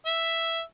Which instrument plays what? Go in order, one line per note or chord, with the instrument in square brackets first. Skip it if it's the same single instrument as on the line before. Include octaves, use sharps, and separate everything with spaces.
[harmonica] E5